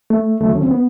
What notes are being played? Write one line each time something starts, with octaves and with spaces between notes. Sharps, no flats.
A3
D#2 D3 F#3 A3
C#4
C4
B3